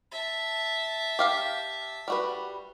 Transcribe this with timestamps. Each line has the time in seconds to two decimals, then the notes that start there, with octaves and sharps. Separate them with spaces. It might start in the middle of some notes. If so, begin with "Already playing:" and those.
0.11 E5 A5
1.19 G4 F5 G5
2.08 G3 F#4 B4